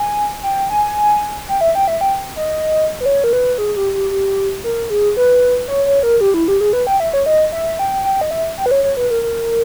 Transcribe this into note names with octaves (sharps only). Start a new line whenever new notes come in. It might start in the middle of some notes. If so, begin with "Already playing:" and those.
Already playing: G#5
G5
G#5
G5
E5
G5
E5
G5
D#5
B4
C#5
A#4
B4
G#4
G4
G4
G4
A#4
G#4
B4
C#5
C#5
A#4
G4
E4
G4
G#4
B4
G5
E5
C#5
D#5
E5
G5
G5
D#5
E5
G5
B4
C#5
C#5
B4
A#4
A#4